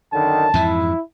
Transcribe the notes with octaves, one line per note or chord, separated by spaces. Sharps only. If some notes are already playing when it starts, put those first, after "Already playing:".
F#2 D3 D#3 A5
F2 G#2 E3 E4